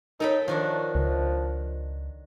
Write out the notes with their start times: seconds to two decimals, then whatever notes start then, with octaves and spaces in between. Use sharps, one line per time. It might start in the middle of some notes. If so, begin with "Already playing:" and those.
0.20 D#4 A4 A#4 C#5 G5 B5
0.48 D#3 F3 D4 F#4
0.95 C#2